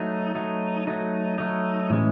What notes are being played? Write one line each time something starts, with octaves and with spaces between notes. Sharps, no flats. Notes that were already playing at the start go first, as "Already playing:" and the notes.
Already playing: F#3 A3 D#4
F#3 A3 D#4
F#3 A3 D#4
F#3 A3 D#4
A2 E3 G#3 C#4